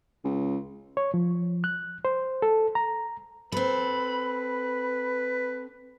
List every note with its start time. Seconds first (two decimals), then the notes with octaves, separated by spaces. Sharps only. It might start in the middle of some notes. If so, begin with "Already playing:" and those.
0.24 C#2
0.97 C#5
1.14 F3
1.64 F#6
2.05 C5
2.42 A4
2.75 A#5
3.52 C4 A4 B4 B5